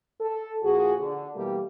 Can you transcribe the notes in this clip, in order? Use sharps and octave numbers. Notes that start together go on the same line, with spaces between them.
A4
A#2 F3 F#4 G#4
D3
B2 E3 G3 A3 A#3 G4